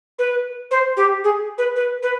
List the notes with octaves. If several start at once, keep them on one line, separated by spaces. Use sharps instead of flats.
B4
C5
G4
G#4
B4
B4
B4